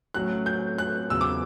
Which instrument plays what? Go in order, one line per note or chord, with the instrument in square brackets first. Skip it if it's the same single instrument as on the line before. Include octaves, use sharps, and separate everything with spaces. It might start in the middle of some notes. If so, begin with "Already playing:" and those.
[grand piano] A2 F#3 C#4 [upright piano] F#6
[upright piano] G6
F#6
[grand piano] E2 C#3 F#3 [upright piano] E6
[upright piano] D6